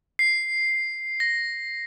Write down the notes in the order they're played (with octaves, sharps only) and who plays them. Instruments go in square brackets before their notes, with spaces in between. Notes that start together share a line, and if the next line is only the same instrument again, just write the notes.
[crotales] C7
A#6